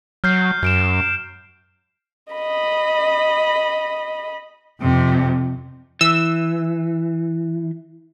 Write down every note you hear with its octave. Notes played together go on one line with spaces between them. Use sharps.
F#3 F6 G6 C7
F#2 G6 D7 E7
D#5 B5
F2 C3
E3 E6